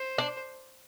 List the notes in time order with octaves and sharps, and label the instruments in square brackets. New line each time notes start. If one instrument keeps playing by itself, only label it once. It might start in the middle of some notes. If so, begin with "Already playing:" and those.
Already playing: [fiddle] C5
[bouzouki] D4